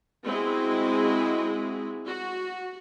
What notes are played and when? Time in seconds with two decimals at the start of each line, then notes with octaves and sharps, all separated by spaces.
0.24 G#3 C4 E4 F#4 G#4
2.04 F#4